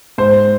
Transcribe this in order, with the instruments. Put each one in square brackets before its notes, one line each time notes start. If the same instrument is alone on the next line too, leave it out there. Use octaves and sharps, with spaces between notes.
[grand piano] G#2 C5